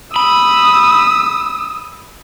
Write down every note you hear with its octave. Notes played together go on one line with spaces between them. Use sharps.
B5 D#6 E6